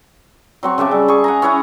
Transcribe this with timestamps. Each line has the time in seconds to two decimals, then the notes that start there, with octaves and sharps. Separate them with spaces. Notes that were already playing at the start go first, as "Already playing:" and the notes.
0.63 F#3 C4 C#6
0.78 C#3 E5 A5 D6
0.91 G3
1.08 G#4 C#6
1.24 F#5 G#5 A#5
1.42 C#4 E4 C#5 F#5